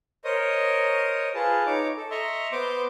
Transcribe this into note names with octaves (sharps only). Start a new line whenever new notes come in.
A#4 C5 C#5 D#5 D#6
F4 G#4 B4 A5
D#4 C#5 D6
A4
D#5 E5 A#5 C6 C#6
B3 C5 C6 D6